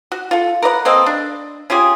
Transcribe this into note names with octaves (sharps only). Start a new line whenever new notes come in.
F#4
F4 A4
A#4 B4 D5 F#5
A#3 C4 A4 D#5
D4
C#4 F4 G4 G#4